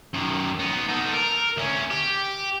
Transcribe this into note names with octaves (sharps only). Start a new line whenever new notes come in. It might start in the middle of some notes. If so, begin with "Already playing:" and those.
F#2 D#3
B3 D#4
D#4 A4
A#4
D2 C#4
G4